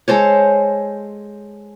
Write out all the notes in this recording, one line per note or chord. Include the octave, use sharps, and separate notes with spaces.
G#3 A4 C5 C#5